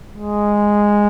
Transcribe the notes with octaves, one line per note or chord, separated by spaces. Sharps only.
G#3